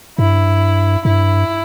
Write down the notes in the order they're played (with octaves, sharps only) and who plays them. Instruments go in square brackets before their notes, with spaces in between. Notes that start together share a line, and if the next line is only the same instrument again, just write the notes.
[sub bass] G2 [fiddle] E4
[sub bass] G2 [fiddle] E4